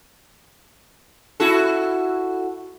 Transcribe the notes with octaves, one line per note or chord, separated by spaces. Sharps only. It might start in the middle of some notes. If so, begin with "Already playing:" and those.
E4 F#4 A4